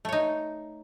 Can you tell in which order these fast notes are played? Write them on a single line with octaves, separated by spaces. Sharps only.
A3 C#5 D#4